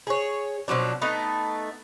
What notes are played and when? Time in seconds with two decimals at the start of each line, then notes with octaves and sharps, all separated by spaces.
0.07 G#4 C#5
0.68 B2 F3 F#3 D4
1.02 A3 B3 D#4